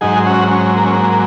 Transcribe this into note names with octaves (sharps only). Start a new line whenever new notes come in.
G#2 F#3 D#4 G#4
C#4 F#4
C#4
A#3
C#4
A#3